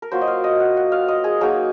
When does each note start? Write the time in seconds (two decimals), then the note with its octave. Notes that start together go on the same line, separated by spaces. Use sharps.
0.02 A#4
0.12 F#3 A#3 F4 C5
0.21 D#5
0.27 F5
0.44 D#5
0.60 F#5
0.77 F#5
0.92 F5
1.08 D#5
1.24 G#4
1.41 F#3 A#3 D#4 G#4